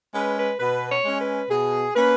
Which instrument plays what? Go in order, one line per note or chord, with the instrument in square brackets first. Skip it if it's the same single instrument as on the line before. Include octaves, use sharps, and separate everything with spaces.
[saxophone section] G#3 C#4 B4
B4
B2 B4
C#5
G#3 C#4
B4
B2 G#4
A#3 C#4 B4